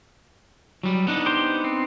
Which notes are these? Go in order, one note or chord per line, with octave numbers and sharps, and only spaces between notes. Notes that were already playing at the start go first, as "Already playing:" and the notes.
F#3 G3
B3 D4 D#4
G4 C5
C4